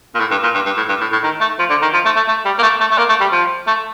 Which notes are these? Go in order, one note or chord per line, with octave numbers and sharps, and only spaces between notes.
A#2
A2
G2
A#2
G2
G2
A2
G2
A2
A2
D#3
A3
F3
D3
D#3
F3
A3
A3
A3
G3
A#3
A3
A3
A3
A#3
A3
G3
F3
A3